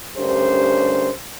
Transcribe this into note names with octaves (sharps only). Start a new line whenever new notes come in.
D2 G2 C#4 G4 A#4 C5